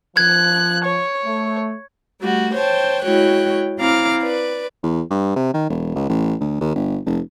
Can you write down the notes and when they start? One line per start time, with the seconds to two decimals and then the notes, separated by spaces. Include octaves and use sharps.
0.17 F3 F#6 G#6
0.84 C#5
1.25 A3
2.21 G3 A3 F#4
2.54 C5 C#5 G5 A5
3.04 G#3 E4 F#4 C#5 G5 F#6
3.79 C4 E4 F5 A#5 D6 F6
4.22 B4 D5
4.83 E2
5.11 G2
5.36 C3
5.54 D#3
5.70 E1
5.95 C#2
6.09 A1
6.40 D2
6.61 D#2
6.75 G1
7.06 F1